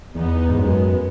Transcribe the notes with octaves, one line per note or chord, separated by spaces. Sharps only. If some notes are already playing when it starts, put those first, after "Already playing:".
E2 B3 D#4
G#2
F#2 G#3 B3